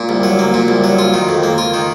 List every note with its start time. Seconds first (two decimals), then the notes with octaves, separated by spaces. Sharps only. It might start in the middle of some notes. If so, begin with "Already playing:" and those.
Already playing: A#2
0.09 C2
0.23 F#3
0.39 A#3
0.54 A#2
0.68 C2
0.84 F#3
0.99 F4
1.14 D#3
1.29 F2
1.43 A#3
1.58 F4
1.74 D#3